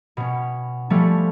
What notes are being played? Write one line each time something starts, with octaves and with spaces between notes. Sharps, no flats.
B2 C#4
F3 G3 A3 C#4